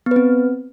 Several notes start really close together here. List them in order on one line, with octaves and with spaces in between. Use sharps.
B3 B4 C4